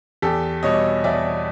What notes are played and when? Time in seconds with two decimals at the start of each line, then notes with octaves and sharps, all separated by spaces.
0.22 E2 G4 A4
0.63 B2 G3 C#5 D#5
1.04 E2 D5 E5